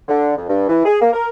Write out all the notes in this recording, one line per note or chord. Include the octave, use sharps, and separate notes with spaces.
D3
F2
G2
E3
G#4
A#3
A#4